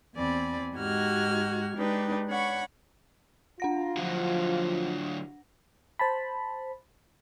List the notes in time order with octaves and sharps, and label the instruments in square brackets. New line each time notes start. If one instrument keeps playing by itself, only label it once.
[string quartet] E2 C4 D5 G#5 B5
G#2 D#4 F#4 G4 F6 G#6
G#3 D4 D#4 G4 B4
D4 C#5 F#5 B5 C#6
[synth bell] D4 F#5 A#6 [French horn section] F4
[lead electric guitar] D3 F#3 [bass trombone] F3
[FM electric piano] C5 A5 B5